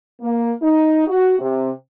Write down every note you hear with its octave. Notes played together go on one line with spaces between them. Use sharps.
A#3
D#4
F#4
C3